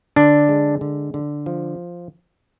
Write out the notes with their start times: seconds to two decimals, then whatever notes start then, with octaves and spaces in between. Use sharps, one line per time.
0.16 D3 D4
0.49 G#3
0.81 D3
1.14 D3
1.46 F3